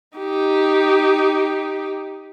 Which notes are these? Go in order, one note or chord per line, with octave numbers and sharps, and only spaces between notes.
D#4 G4